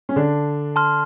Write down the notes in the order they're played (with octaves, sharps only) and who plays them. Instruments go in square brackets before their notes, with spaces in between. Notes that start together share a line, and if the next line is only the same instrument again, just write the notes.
[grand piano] C#4
D3 D4
[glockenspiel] A5 C6 F6